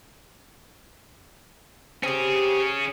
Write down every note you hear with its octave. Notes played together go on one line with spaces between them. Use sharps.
C4 C#4 G4 G#4